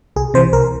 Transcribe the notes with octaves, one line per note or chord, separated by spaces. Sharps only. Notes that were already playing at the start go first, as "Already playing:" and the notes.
C2 G#4
C3 E3 C5
C2 A#4